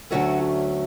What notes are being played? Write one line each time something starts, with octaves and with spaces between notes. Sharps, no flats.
D2 D3 F#3 A3 C#4 F#4